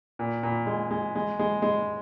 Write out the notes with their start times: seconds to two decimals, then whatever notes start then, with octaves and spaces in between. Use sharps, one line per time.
0.19 A#2
0.43 A#2
0.66 G#3
0.91 G#3
1.15 G#3
1.39 G#3
1.62 G#3